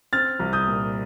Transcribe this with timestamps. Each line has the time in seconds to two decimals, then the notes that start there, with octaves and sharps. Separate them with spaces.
0.13 C4 F6 A6
0.39 C2
0.53 D#6 G6
0.67 A#2